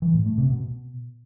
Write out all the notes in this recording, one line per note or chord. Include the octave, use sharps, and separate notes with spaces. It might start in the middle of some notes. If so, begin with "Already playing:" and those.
E3
A2
A3
C3
B2